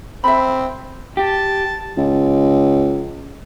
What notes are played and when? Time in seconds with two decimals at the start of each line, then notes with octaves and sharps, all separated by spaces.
0.24 C4 E5 B5
1.17 G4 A5
1.98 C#2